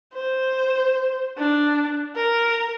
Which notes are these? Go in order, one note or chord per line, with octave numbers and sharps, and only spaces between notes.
C5
D4
A#4